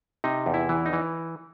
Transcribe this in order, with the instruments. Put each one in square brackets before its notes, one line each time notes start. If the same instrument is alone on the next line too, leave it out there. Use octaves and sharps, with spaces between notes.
[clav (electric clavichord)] C3 D#4
E2
E4
E3
D#4
E3